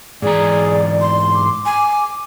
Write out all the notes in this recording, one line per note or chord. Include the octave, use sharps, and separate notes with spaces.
G#2 E3 G#4 D5 A#5
C6
D6
G#5